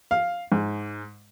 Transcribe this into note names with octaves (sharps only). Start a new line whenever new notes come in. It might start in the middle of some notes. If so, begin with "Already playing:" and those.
F5
G#2